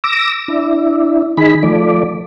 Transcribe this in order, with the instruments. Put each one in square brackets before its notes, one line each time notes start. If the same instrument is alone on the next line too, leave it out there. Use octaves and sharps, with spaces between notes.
[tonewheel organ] D6 E6 A#6
D4 E4
D#3 D#4 G#4 B5
F3 A3 D5